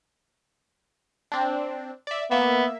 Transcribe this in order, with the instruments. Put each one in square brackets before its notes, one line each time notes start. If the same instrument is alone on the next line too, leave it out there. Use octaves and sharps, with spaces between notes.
[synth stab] C4 D4
D5 E5
[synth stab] A#3 E5 [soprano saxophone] B3